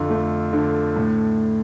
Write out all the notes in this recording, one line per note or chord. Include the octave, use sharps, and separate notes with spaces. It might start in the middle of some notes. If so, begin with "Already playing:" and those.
Already playing: F2 D3
A3
D3
A2